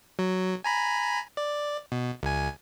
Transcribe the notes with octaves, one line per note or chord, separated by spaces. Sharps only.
F#3
G#5 A#5 B5
D5
B2
C#2 G#5